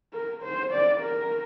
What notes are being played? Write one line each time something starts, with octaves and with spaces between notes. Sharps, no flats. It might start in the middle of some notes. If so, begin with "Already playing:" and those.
A#4
C5
D5
A#4